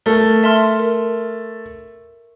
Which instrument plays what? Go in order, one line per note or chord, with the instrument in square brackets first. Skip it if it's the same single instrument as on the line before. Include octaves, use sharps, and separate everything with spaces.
[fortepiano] A3 [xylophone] A#4
[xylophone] E5 A5 C6 F6
A#4